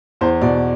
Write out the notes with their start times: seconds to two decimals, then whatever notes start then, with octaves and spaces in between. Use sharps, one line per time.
0.21 E2 C5
0.42 B2 D5